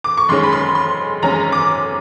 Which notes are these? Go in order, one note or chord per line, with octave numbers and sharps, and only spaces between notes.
D6
C#6
F#2 D#3 G#3 C#4 C6
B5
C6
C6
F#2 D#3 G#3 C#4 A#5
D6